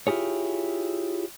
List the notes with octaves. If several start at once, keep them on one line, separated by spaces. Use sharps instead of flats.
E4 F4 G4 G#4 C#5